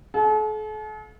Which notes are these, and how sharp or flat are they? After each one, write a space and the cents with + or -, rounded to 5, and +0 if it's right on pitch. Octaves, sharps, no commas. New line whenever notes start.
A4 -45 F5 +40